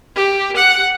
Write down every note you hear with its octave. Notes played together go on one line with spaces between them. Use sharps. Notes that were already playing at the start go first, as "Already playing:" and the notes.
G4
F#5